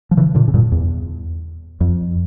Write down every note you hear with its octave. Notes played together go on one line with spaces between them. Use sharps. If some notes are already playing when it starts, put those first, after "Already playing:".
F3
C#3 E3
A#2 D3
C#3
G2 A#2
E2
F2